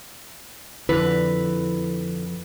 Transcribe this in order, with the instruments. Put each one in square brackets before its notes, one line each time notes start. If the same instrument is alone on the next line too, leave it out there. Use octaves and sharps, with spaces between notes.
[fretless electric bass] F2 [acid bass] D3 [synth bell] E4 [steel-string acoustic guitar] B4